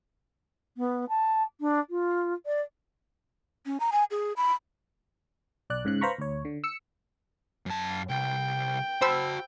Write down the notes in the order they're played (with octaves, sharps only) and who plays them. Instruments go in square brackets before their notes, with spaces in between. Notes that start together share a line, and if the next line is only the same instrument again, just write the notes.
[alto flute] B3
A5
D4
F4
D5
[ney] C#4
A#5
G#5
G#4
B5
[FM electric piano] B1 D5 F#6
G#2 C#3 F#6
B4 C5 F5 A#5 B5 C#6
D2 C#5
D3
E6 C#7
[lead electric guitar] F#2 A5
[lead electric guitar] C2 [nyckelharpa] G5
[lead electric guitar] F#4 A5 [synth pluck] C5 B5 E6